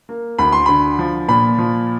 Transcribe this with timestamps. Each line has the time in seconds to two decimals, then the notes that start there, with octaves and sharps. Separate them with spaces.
0.09 A#3
0.39 D2 B5
0.52 C6
0.66 D3 B5
0.99 F3
1.28 A#2 B5
1.58 F3